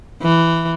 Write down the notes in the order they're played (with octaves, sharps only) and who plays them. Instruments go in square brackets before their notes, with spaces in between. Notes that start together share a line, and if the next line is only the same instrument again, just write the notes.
[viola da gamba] E3